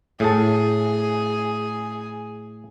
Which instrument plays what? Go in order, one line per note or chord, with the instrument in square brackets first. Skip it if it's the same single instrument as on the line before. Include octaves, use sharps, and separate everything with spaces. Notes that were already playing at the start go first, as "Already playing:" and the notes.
[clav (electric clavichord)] A2 A5 [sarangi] G#4